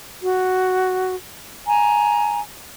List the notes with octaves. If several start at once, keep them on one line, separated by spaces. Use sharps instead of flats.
F#4
G#5 A#5